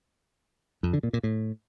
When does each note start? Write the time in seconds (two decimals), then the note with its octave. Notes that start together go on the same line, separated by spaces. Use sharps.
0.83 F2
0.93 D3
1.03 A#2
1.13 A#2
1.23 A2